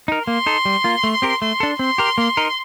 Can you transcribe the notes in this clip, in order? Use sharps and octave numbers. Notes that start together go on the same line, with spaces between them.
D#4 A#4
A#3 C6
D#4 A4
G3
A#3 F4
A3
C4 G4 A#4
A3 C6
D4 A4
C4 C6
G4 A#4
A#3
D#4 A#4